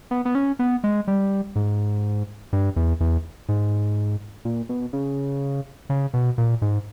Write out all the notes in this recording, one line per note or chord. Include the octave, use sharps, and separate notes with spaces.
B3
B3
C#4
B3
G#3
G3
G#2
G2
E2
E2
G#2
A#2
B2
C#3
C#3
B2
A#2
G#2